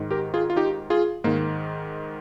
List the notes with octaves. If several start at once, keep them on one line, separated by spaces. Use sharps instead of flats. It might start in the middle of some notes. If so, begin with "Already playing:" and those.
Already playing: G#2 D#3
G4 A#4
F4 G#4
F4
D#4 G4
F4 G#4
G#2 D#3 A#3